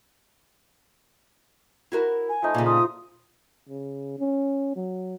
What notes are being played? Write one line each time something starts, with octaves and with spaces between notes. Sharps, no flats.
E4 F#4 A#4
G#5
F3 A3 D#4
A#2 C#3
F4 D#6
C#3
C#4
F#3